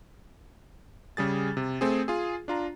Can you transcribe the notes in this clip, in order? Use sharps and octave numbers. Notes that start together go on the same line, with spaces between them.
C#3 G3 G#4 A6
C3
A3 C4 G#4
F4 G#4
D4 F4 A#5